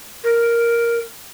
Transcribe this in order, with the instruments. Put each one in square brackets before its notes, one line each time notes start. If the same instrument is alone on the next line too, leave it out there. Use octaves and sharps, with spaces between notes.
[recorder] A#4